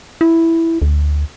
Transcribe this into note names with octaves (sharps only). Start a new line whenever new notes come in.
E4
D2